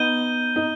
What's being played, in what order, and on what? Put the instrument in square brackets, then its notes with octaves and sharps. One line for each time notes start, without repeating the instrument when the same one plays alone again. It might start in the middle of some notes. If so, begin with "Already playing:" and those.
Already playing: [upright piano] B3 D#4 [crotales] G6 D#7 G7
[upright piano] D#4